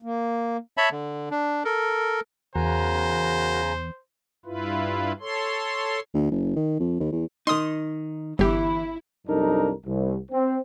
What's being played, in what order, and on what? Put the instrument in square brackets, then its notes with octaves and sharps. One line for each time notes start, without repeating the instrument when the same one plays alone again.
[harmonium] A#3
[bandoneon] C#5 E5 A5 B5
D3
D4
A4 A#4
[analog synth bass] E2 [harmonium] C#3 G#5 A#5 [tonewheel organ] F#4 A#4 [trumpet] C5
[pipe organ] G2 E4 F4 B4
A4 C#5 C6
[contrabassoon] D2
F#1
D#3
F2
D#2
E2
[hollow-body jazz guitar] D#3 D#4 [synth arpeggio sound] C6 D#6
[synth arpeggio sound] G1 G4 [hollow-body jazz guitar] E3 [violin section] E4
[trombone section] C2 F#2 D4 D#4 A4 A#4
C2
C4